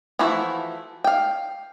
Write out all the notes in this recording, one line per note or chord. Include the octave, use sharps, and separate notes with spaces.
E3 F3 A3 E4 F#4
F5 G5